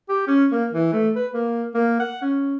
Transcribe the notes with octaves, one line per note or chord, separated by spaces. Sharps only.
G4
C#4
A#3
E3
A3
B4
A#3
A#3
F#5
C#4